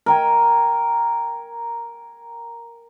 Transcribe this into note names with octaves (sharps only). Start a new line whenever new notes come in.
A#4 G5 G#5